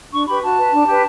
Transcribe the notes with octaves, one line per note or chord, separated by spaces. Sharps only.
D4 C#6
G4 B4 B5
F#4 A5
B4
D4
G4 B4